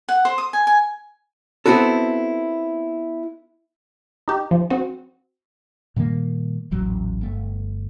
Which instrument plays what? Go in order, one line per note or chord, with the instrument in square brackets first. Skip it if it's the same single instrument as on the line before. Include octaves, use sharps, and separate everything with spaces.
[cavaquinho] F#5
C5
D#6
G#5
G#5
[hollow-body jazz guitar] B3 C4 E4 F#4 A4
[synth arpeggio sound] D#4 G4
F3
C4 F#4
[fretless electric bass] A#2 D#3 G3 A#3
D#1 A1 F#3
G1 A3